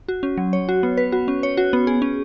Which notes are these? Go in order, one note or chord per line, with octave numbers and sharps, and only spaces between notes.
F#4
C#4
F#3
C#5
F#4
B3
B4
F#4
C#4
C#5
F#4
B3
G#4
C#4